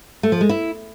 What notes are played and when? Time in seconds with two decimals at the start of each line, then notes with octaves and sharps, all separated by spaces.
0.23 A3
0.32 F3
0.41 G#3
0.49 E4